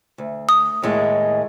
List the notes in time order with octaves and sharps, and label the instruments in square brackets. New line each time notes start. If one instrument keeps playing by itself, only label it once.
[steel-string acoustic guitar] D2
[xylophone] D#6
[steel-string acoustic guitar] D#2 A2 G#3